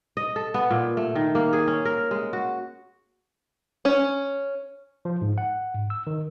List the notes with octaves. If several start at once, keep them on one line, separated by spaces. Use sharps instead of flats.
D#5
A4
B3
A#2
A3
D#3
A#3
G#4
C#4
A#4
G#3
F#4
C#4
F3
G#2
F#5
G#2
E6
D#3